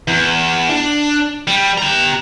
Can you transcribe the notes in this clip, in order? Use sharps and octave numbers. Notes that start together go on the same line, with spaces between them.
E2
D4
G3
G4 A#5